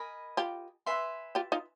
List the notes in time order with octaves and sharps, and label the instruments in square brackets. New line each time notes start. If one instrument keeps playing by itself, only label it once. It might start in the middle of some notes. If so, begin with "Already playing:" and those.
Already playing: [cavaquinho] A#4 D#5 G#5 B5
[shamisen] F4 G4
[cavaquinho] B4 E5 G#5 C6
[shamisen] F4 G4
D#4 F4